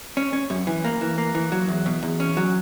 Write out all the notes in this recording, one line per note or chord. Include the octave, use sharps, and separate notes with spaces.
C#4
C#4
F#2
E3
A#3
E3
A#3
E3
F#3
E2
B2
E2
C#4
F#3